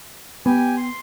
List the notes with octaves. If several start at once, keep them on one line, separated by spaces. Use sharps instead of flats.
B3 G4 G#5
C6